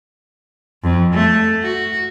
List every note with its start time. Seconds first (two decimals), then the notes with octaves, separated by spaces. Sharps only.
0.83 F2
1.13 A3
1.62 F#4